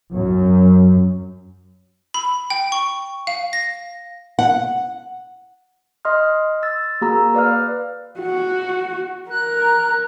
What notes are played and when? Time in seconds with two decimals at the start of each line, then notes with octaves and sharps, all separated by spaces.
0.13 F#2
2.14 B5
2.50 G5
2.72 C#6
3.27 F5
3.53 A#6
4.39 F#5
6.05 D#5 C6 D#6 F6
6.63 E6 A6
7.01 A#3 F#4 G#4 A#5 E6
7.34 B4 D5 F5 F6
8.20 F#4
9.30 A#4 F#6